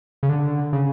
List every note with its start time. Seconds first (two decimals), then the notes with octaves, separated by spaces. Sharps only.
0.23 C#3
0.29 D3
0.73 C#3